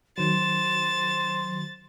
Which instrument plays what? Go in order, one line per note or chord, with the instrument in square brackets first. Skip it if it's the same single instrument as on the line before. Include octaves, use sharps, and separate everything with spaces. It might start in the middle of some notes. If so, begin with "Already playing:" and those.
[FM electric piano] D#3 F#3 [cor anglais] C5 [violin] A6 [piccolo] E7